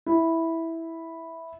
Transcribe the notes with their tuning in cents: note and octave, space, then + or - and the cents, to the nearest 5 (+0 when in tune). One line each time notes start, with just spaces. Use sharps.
E4 -5